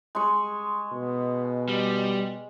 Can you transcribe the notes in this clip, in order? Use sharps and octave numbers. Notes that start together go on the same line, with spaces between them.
G#3 C#6
B2
G3